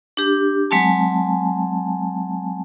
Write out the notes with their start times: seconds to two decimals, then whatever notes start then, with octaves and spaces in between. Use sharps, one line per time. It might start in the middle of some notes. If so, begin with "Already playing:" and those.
0.17 D4 G4
0.71 F#3 G#3 C4 G#5 A5